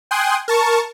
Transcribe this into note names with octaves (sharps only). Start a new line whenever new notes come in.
G5 G#5 C6 D#6 F#6
A#4 A5 C#6